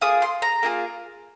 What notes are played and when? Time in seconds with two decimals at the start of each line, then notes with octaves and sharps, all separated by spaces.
0.01 A#3 F4 G#4 D#6
0.22 C6
0.42 A#5
0.63 A#3 F4 G#4